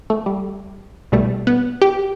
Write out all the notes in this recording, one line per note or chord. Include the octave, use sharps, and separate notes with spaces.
A3
G3
C2 B2 G3 A3
B3
G4